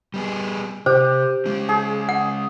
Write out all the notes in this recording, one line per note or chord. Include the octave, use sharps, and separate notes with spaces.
G3 B3 G#4
C3 G4 C5
G#3 C#4
G#4
F#5